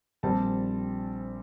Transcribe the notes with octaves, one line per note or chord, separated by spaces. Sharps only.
A#1 A#2 G3 C4 A5